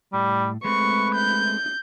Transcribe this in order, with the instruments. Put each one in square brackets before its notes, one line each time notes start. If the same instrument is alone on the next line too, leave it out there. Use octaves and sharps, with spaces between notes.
[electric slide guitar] A2 [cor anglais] G3
[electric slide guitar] G#3 A3 C4 [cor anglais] B4 [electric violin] C#6
[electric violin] G6